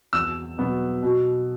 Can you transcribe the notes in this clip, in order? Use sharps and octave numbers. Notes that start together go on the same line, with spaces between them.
E2 E6
B2 F#3 B3
B2